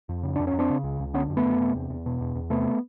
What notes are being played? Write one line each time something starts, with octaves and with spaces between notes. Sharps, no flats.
F2
C#3
F2 D4
C#4
F2
C4 D4
C#3
C#2
C#2
D3 B3 C#4
F#2
A3 B3
F#2
C3
E2
E2
B2
E2
E2
C3 A3 B3